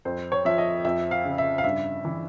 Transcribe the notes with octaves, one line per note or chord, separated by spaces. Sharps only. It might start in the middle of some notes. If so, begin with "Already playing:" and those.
F2 C5
C#5
F3 E5
D#5
F2 E5
F5
C#3
E5
F5
G2 E5
E3